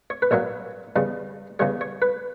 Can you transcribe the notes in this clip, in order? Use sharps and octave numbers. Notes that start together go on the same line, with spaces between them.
C#5
B4
A#1 A#2 F#3 C#5
E2 C#3 G3
E2 C#3 G3 C#5
C#5
B4